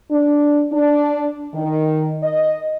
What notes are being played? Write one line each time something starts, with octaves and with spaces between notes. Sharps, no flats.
D4
D4
D#3
D#5